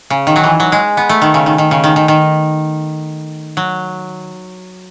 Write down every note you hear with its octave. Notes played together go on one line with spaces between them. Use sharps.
C#3
D#3
F#3
E3
F#3
G#3
B3
A3
D#3
C#3
D#3
D#3
C#3
D#3
D#3
D#3
F#3